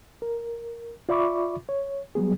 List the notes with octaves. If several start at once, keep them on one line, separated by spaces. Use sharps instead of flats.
A#4
F4 D5 E5 B5 C#6 D6
C#5
F#3 G3 B3 G#4